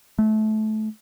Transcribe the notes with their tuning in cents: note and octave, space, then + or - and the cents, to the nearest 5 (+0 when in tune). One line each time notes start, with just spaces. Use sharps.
A3 -25